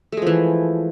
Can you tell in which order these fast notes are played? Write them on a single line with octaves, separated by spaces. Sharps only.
A3 G#3 F3 E3